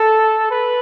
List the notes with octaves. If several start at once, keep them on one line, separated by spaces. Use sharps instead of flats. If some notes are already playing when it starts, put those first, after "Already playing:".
Already playing: A4
B4